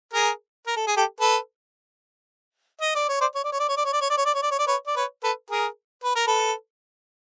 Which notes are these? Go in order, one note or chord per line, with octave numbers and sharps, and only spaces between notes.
G#4 A#4
A#4
A4
G#4
G4 A4
A4 B4
D#5
D5
C#5
C5 D5
C#5
D5
C#5
D5
C#5
D5
C#5
D5
C#5
D5
C#5
D5
C#5
D5
C#5
D5
B4 C#5
D5
B4 C#5
A4 B4
G#4 A#4
B4
A#4
A4 B4